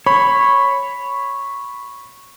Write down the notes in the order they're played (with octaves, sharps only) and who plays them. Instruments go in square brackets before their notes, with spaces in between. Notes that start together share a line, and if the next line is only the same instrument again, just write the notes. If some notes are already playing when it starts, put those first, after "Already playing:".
[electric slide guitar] C#5 [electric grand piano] B5